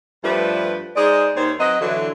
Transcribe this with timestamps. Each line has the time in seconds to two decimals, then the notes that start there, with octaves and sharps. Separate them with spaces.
0.24 G2 F3 G3 A3 B4 C5
0.96 G#3 D#4 G#4 C5 D5
1.36 D#2 D#3 C5 C#5
1.60 F#3 C4 B4 D#5
1.81 D3 E3 F#3